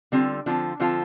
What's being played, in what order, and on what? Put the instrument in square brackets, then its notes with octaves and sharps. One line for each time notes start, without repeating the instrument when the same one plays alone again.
[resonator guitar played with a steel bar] D3 G3 C4 F4
D3 F3 C4 F4 A4
D3 F3 C4 F4 A4